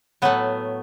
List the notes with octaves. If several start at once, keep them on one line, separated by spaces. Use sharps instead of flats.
A2 F#3 A3 B3